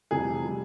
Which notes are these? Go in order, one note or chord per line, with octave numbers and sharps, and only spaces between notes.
F1 F2 C3 E3 G3 G#4
C3 G3